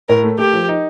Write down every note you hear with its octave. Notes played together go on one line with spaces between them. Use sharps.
A2 A#4
A3
A3 G4
F3
D#4